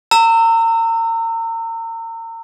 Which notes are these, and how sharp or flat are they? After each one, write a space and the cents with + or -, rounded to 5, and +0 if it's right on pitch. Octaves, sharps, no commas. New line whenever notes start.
A#5 -35 E6 +0